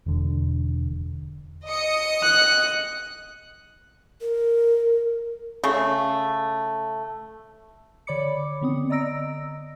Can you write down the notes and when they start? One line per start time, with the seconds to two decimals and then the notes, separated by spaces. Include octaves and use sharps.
0.06 E1 D3
1.68 D#5 D#6 C#7
2.23 F#6
4.21 A#4
5.64 C#3 A3
8.07 D3 C#5 D5 B5 D6 C#7
8.61 D3 B3 C4 D#6
8.90 D5 D#5 A#5 E6 A#6 D7